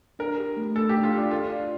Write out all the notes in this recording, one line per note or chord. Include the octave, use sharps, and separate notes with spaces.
D4 A#4
G4
A3
A3 A4
G4
D4
F4
D4 G4
F4 A4
D5